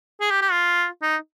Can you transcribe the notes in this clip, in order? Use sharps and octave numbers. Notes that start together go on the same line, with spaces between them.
G#4
G4
G4
F4
D#4